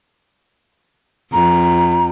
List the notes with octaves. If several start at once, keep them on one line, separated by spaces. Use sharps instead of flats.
F2 A#5